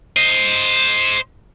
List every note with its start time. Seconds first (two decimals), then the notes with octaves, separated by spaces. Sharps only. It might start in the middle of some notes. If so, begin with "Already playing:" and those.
0.17 C5 D#5